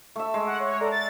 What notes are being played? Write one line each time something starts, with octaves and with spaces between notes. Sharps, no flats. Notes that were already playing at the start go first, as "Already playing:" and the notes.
A3 E5
G#3
F#5
C#5
A4 D5 A#5
A6